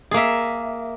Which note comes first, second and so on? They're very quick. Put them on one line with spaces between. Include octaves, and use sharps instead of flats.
G#4 A#3 E5